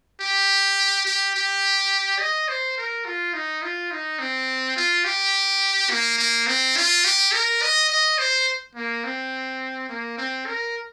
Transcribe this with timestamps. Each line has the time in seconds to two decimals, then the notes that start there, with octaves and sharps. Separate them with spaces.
0.20 G4
1.06 G4
1.35 G4
2.19 D#5
2.48 C5
2.78 A#4
3.05 F4
3.33 D#4
3.63 F4
3.91 D#4
4.19 C4
4.77 F4
5.04 G4
5.90 A#3
6.18 A#3
6.47 C4
6.76 F4
7.05 G4
7.32 A#4
7.62 D#5
7.90 D#5
8.18 C5
8.75 A#3
9.04 C4
9.89 A#3
10.17 C4
10.47 A#4